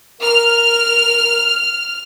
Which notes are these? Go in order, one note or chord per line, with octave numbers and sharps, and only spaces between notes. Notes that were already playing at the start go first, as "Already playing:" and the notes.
A#4 F6